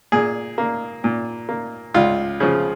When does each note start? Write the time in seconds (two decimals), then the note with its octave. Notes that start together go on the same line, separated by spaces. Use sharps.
0.12 A#2 G#4
0.58 A#3
1.04 A#2
1.49 A#3
1.94 C#2 F4
2.40 C#3 F3